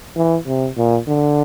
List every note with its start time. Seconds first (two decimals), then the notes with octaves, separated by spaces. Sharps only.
0.16 E3
0.47 C3
0.77 A#2
1.08 D3